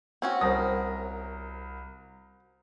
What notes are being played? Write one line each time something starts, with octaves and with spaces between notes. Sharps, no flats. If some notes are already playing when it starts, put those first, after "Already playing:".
C4 C#4 F#4
C2 A#4 C5 A5 D#6 A#6